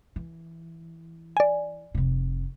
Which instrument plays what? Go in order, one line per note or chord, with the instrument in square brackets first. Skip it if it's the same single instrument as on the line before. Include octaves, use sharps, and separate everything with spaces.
[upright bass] E3
[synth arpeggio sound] D5 G#5
[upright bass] F1 C3